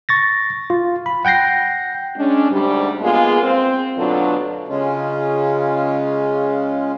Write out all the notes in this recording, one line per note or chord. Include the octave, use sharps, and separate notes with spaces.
C#6 A6 A#6
F4
B5
F#5 G5 G6 A#6 C7
G#3 C#4 D4
D2 G#2 D3 G3
G#3 A#3 B3 F4 G#4
C4 C5
D2 B2 F#3 D4 F4 A4
C#3 G#3 C#4 F4